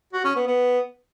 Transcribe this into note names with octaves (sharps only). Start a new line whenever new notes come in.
F#4
C#4
B3
B3